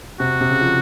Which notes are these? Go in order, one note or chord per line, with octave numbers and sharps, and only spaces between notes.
C3 F#4
C3
C#3
F3